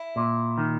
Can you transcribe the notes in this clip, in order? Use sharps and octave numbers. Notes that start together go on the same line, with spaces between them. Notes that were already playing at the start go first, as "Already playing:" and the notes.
Already playing: E4
A#2
D#3